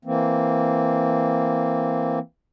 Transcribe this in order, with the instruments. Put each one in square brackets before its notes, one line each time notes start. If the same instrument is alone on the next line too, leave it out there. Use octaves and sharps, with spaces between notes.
[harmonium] E3 A#3 C4